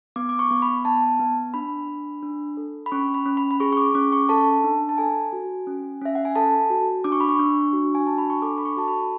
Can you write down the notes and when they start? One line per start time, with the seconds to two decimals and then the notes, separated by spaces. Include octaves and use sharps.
0.16 B3 D6
0.29 D6
0.39 C#6
0.51 B3
0.62 B5
0.85 B3 A5
1.20 B3
1.54 D4 B5
1.88 D4
2.23 D4
2.57 A4
2.86 B5
2.92 C#4 C#6
3.14 B5
3.26 C#4
3.37 B5
3.51 B5
3.60 G#4 C#6
3.73 C#6
3.77 D6
3.95 C#4 D6
4.12 C#6
4.29 A4 A5
4.64 D4
4.89 A5
4.98 A4 G#5
5.33 F#4
5.67 C#4
6.01 C#4 E5
6.15 F#5
6.25 G#5
6.35 A4 A5
6.70 F#4
7.04 D4 D6
7.12 C#6
7.20 B5
7.29 C#6
7.39 D4
7.73 F#4
7.95 G#5
8.07 D4 A5
8.18 B5
8.30 C#6
8.42 A4 D6
8.58 B5
8.65 C#6
8.77 F#4 A5
8.88 B5